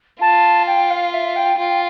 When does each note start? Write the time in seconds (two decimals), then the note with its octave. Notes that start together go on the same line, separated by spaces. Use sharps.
0.21 F4 A5
0.67 G5
0.90 F5
1.13 E5
1.36 G5
1.59 F4 G5